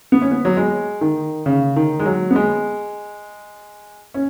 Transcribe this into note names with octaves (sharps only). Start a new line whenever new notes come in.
B3
C#4
B3
F#3
G#3
D#3
C#3
D#3
G#3
F#3
B3
G#3
C#4